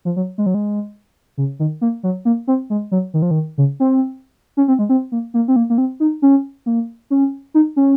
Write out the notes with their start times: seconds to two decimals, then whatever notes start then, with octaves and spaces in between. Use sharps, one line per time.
0.05 F3
0.16 F#3
0.38 G#3
0.46 F#3
0.54 G#3
1.37 C#3
1.59 D#3
1.81 A#3
2.03 F#3
2.25 A#3
2.47 C4
2.70 G#3
2.92 F#3
3.14 D#3
3.22 F3
3.31 D#3
3.58 C#3
3.80 C4
4.57 C#4
4.68 C4
4.79 G#3
4.89 C4
5.12 A#3
5.34 A#3
5.48 C4
5.56 A#3
5.70 A#3
5.78 C4
6.00 D#4
6.22 C#4
6.66 A#3
7.10 C#4
7.54 D#4
7.76 C#4